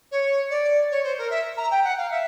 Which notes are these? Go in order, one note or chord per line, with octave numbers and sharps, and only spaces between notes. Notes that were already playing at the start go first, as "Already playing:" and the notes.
C#5
D5
C#5
C5
A#4
E5
A#5
G5
F#5
F5
E5